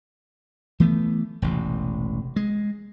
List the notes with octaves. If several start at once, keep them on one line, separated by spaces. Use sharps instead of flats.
E3 A3 B3
E1 A1 C3
G#3